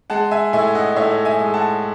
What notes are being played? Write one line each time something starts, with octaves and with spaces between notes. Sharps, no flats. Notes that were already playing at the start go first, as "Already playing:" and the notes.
G#3 F#5 A5
E5 G#5
A2 E5 G#5
D#5 F#5
A2 C#5 E5
E5 G#5
G#3
F#5 A5